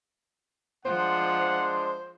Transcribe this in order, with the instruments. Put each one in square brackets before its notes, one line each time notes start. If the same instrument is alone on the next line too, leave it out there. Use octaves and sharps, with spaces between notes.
[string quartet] F3 [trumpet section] G#3 D4 C6 [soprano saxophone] C5 [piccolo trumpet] F#5